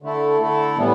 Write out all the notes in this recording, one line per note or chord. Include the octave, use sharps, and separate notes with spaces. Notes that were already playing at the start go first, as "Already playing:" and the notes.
D3 A3 E4 A4
D3 A3 E4 A4
A2 E3 G3 B3